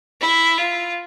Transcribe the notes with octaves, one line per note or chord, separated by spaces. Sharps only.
E4
F4